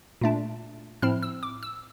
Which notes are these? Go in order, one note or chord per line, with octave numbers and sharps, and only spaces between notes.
A#2 A3 D4
A2 F3 C4 E4 F6
E6
D6
E6